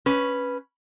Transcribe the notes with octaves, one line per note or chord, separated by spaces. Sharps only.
C#4 B4